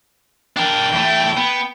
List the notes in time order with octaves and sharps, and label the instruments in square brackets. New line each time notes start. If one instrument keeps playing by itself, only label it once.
[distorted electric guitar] D4 A#4 [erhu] G5
[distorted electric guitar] E2 A3
B3